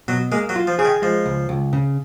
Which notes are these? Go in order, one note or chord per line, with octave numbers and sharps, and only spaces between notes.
B2 F#3
G#3 A#3
F#3
F4
F3
C#3 G#4
D#3
F3 G#3
C#2
C#2
C#3